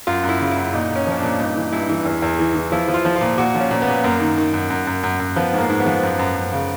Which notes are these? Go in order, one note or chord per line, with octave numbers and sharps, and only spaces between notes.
F#2 F4
F#2
E4
C#3
E4
F#2
A#2 D#4
A#2
C#4
F3 C#4
D4
A#2
G2 D#4
E3
G2 E4
E3
E2
E2
E3
E3
F3 E4
F3
F4
F3
F4
A#2
A#2 F#4
F3
C#4
A#2
B3
A#2
F#2 A#3
D#3
D#3
F#2
F#2
F#2
F#2
F#2
F3 B3
G#2
A#3
G#2
B3
F3
F#2
F#2
F#2
C#3